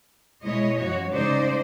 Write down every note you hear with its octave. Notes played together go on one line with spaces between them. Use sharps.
B2 G#3 E4 C#5 D#5
F#2 F3 F#4 C#5
C#3 G#3 D#4 C5 D5